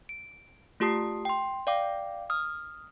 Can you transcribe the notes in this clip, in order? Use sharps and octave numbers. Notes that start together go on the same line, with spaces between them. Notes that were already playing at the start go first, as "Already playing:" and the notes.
D7
A3 F4 G4 A5 D#6 C7
G5 C6
D5 F5 G5 D6
D#6 F6